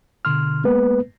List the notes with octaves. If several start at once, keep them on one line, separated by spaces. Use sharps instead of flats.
B2 D3 C6 F6
G#3 A#3 B3 B4